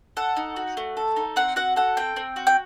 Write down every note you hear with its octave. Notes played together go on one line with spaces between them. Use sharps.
A4 F#5
D#4
F#4
A3
A4
D#4
C4 F#5
F#4 F#5
A4 F#5
C4 G5
C4
F#4
G5